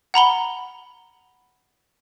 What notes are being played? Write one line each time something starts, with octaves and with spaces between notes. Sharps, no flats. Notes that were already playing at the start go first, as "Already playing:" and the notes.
F#5 A#5 B5 G7